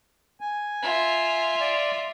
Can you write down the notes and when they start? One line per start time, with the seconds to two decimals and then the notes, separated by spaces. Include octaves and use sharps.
0.41 G#5
0.82 F4 E5
1.60 D5